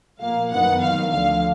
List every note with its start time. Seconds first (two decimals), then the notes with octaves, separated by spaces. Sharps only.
0.20 A#2 F3 A#3 F5
0.51 F#2 D#3 F#3 B3 F#5
0.81 D#2 D#3 F#3 F5
1.12 D2 D3 F3 F5